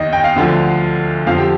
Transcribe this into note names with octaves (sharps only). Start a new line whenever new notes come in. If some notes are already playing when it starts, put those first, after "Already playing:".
Already playing: D#2 D#3 D#5
G5
F5
D2 D3 F3
F2 D3 F3 F5
G4